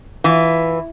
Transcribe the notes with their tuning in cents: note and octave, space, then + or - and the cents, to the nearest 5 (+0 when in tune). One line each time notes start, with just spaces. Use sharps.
E3 +0 F4 +15